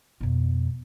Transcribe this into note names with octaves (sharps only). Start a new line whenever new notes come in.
F2 B2